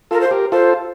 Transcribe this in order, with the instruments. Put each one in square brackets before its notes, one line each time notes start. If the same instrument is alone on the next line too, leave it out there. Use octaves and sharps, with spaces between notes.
[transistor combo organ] F4 A4 [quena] A#4
[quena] C5
[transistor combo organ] G4 A#4
[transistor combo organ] F4 A4 [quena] C5